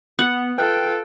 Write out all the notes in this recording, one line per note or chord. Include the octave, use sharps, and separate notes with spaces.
B3 F#5
F4 A4 B4 G5 F6 F#6